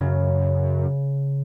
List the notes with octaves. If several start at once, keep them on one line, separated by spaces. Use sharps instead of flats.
F#2 C#3